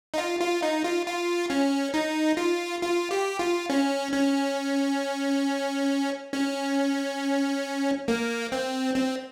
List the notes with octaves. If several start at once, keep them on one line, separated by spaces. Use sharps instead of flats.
D#4
F4
F4
D#4
F4
F4
C#4
D#4
F4
F4
G4
F4
C#4
C#4
C#4
A#3
C4
C4